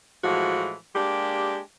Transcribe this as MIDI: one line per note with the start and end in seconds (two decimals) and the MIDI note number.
0.24 0.75 45
0.24 0.75 52
0.24 0.75 53
0.24 0.75 56
0.24 0.75 66
0.96 1.60 56
0.96 1.60 58
0.96 1.60 62
0.96 1.60 67